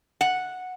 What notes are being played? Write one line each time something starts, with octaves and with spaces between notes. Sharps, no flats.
F#5